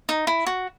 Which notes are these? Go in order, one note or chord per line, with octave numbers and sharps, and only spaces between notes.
D#4
E4
F#4